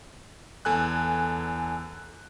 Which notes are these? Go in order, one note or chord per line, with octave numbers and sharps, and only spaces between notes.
E2 A4 G#5 F#6